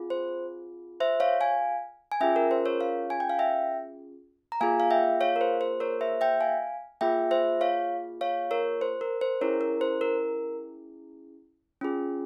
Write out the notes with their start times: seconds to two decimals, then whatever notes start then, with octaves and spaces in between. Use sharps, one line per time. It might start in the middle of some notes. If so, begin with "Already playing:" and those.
Already playing: C4 F4 G#4
0.10 C5
1.00 C5 E5
1.20 C#5 F5
1.41 F5 G#5
2.12 G#5
2.21 C#4 F4 G#4 E5 G5
2.36 A#4
2.51 C5
2.66 A#4 C#5
2.81 C#5 F5
3.10 G#5
3.20 G5
3.30 F5
3.39 E5 G5
4.52 A#5
4.61 A#3 F4 G#4 F5 G#5
4.80 F5
4.91 E5 G5
5.21 C#5 F5
5.36 A#4
5.41 C5
5.61 C5
5.80 A#4 C#5
6.01 C5 E5
6.21 E5 G5
6.41 F5 G#5
7.01 A#3 F4 G#4 E5 G5
7.31 C5 E5
7.61 C#5 F5
8.21 C#5 F5
8.51 A#4 C#5
8.81 C5
9.01 A#4
9.21 C5
9.41 C#4 E4 G#4 A#4 C#5
9.61 A#4
9.81 C5
10.01 A#4
11.81 C#4 F4 G#4